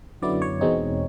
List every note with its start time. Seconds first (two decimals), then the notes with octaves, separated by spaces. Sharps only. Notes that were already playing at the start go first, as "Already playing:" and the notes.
0.22 F#2 D3 F#3 B3 E4 D5
0.42 C#5
0.61 E2 B2 G#3 C4 D#4